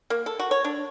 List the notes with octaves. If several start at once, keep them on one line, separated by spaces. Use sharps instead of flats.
A#3
A4
F#4
C#5
D4